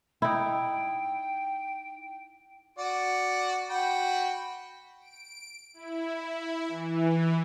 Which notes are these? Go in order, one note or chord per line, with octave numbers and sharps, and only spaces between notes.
D#4 E4 G5
F#4 D5
F#4 G5 B5
D7
E4
E3